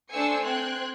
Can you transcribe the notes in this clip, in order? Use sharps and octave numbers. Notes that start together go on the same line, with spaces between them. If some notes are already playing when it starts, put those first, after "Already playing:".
A3 D4 C5 G#5 E6 C#7
C4 G5 C6 F#6 G#6